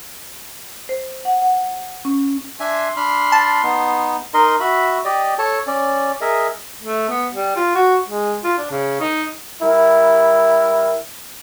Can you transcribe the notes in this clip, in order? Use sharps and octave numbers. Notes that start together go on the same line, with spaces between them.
C5
F#5
F#5
C#4
D4 E5 G#5 C6
D4 B5 F6
A5
B3 D#4
D#4 A#4 D#5 C6
F#4 E5 B5
G4 D5 D#5
A4 C#5 A5
C#4 D5
G#4 A#4 D#5 E5
A3
B3
G3
F4
F#4
G#3
F4
D4
C#3
D#4
G3 E4 A#4